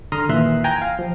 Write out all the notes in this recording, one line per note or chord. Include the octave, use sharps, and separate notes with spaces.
D3 A#5 C6 D#6 F6
D#2 A#2 E3 E5 C6 F#6
G5 G#5 A#5
F5
F3